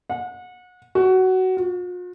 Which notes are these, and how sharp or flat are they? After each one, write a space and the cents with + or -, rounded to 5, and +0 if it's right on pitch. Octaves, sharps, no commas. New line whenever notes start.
F#5 -30
F#4 +15
F4 +45